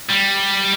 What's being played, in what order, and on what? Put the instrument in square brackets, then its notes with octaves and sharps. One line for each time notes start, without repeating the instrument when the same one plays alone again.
[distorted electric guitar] G3